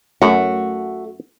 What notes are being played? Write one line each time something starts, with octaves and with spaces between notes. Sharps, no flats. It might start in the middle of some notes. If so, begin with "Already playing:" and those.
F#2 A3 F#4